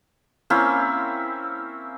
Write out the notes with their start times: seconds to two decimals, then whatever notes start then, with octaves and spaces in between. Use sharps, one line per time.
0.50 A#3 C4 C#4 E4